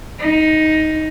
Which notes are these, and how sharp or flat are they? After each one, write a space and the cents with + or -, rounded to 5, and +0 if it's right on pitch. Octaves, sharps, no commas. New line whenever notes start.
D#4 +10